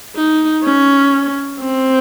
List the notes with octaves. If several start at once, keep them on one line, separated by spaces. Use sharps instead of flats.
D#4
C#4
C4